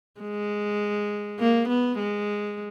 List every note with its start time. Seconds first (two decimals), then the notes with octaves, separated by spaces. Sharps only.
0.21 G#3
1.40 A#3
1.69 B3
1.99 G#3